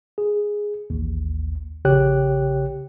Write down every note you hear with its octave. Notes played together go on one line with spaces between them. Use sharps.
G#4
A1 D#2
A#1 C#3 G4 C#5 G5 F#6